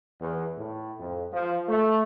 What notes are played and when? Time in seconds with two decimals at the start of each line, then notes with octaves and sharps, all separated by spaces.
0.20 E2
0.57 A2
0.99 F2
1.33 F3
1.68 A3